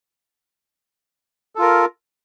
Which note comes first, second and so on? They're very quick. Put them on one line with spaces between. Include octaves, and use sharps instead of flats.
A4 F4 A#4